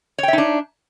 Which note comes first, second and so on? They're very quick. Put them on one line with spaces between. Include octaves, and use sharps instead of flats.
C#5 G5 E5 D#4 D4